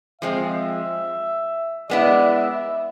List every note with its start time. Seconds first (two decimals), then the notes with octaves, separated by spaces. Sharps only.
0.21 F3 G#3 C4 E5
1.89 G#3 B3 E4 D5
2.31 E5